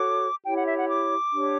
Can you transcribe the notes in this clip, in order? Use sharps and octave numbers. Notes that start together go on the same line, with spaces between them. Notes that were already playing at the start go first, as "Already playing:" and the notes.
Already playing: F#4 A4 C#5 D6
E4 G4 C#5 G5
F#5
E5
F#5
D6
D4 G4 C#5